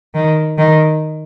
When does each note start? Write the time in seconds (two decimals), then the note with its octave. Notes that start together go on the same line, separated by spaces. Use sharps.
0.14 D#3
0.58 D#3